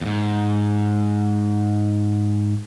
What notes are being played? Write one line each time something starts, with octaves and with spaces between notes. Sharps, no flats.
E2 G#2